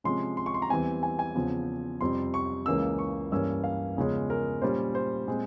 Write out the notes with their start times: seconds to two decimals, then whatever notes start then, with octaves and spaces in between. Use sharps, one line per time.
0.04 C3 F3 G#3 C#4 C6
0.37 C6
0.46 C#6
0.54 C6
0.62 A#5
0.70 E2 E3 G3 C4 G#5
1.03 G#5
1.19 G#5
1.35 E2 C#3 F3 C4
2.01 F2 C3 G3 C4 C6
2.34 C#6
2.66 C#2 C#3 E3 A#3 C#4 E6
2.99 C#6
3.32 G2 E3 G3 A#3 C#4 E6
3.64 F5
3.97 E2 C#3 F3 G#3 C#4
4.30 A#4
4.62 A#2 G3 C#4 C5
4.95 C5
5.27 A#2 G#3 C4